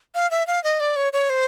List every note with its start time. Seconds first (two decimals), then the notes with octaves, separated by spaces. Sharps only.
0.15 F5
0.31 E5
0.47 F5
0.64 D#5
0.80 D5
0.96 C#5
1.13 C#5
1.30 C5